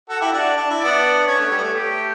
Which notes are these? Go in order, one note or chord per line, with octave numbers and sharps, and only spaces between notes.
F#4 A4
E4 G4
D4 F#4 D5
D4
E4
B3 D4 D5
C#4 C#5
A3
G3
B3
A3
A3 G4